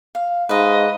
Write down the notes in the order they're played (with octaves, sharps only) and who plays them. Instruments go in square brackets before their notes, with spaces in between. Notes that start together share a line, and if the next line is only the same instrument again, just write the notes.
[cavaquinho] F5
[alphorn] G#2 [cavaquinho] B4 F5 [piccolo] D#5